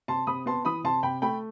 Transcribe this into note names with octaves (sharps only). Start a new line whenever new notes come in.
C3 A5 C6
C3 B5 D#6
B3 A5 C6
E3 B5 D#6
C3 A5 C6
C3 G5 B5
A3 G5 B5